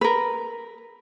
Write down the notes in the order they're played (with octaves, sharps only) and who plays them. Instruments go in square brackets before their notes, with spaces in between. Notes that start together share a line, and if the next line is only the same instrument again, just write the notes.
[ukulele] A#4 B4